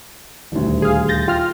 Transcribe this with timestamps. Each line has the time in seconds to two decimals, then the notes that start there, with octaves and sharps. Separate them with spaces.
0.52 D#1 D2
0.82 G#4 F5
1.08 G6 A6 A#6
1.28 F4 G5 F6